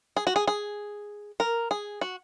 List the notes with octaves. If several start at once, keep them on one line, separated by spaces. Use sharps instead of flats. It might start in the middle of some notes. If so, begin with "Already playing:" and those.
G#4
F#4
G#4
G#4
A#4
G#4
F#4